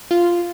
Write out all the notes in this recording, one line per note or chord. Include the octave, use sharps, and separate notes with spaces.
F4